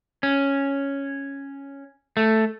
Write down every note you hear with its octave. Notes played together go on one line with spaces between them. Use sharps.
C#4
A3